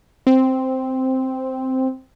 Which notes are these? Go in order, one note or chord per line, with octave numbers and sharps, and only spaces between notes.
C4